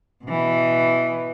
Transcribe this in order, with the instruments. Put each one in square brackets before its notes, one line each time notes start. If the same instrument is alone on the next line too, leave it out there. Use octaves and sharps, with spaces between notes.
[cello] B2 E3